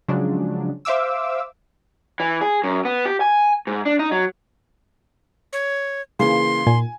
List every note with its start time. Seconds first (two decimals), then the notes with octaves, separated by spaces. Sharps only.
0.08 C#3 F3 F#3 G#3 D4
0.85 C5 E5 F5 D6 E6
2.20 E3
2.41 G#4
2.64 F#2
2.85 B3
3.05 G4
3.21 G#5
3.67 G#2
3.86 D4
3.99 D#4
4.12 F#3
5.53 C#5
6.19 C#3 E3 A#3 C6
6.67 A#2 G#5